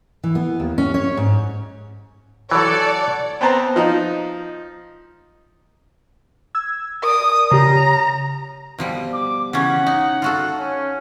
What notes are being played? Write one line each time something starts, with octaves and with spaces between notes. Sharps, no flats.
E3
B3
D#2
C#4
C#5
G#2
E3 F#3 A4 C#5 D5 F#5
B3 C4 C5 A5 A#5
F3 D#4
E6 G#6
A#4 D5 D#6
C#3 G4 A#5
B2 F3 G3
D6
C#3 E3 C#4 F#5
D#4
F4 F#4 A4
C#4